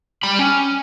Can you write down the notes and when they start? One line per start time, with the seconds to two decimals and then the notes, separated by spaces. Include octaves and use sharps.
0.23 G3 B5
0.39 C#4